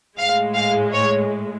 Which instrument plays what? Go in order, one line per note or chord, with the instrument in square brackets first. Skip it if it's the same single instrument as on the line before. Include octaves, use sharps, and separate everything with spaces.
[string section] A2 G#3 F5
F5
C#5